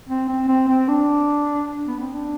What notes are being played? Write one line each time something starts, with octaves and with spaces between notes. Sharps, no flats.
C4
C4
C4
C4
D4
B3
C4
D4